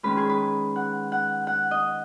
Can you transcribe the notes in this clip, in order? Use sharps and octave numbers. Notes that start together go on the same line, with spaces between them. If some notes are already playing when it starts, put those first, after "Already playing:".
D#3 G#3 C#4 B4
G#4
B4
F#5
F#5
F#5
D#5